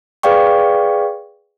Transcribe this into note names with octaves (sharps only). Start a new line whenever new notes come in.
G#4 B4 D5 F5 G5 C#6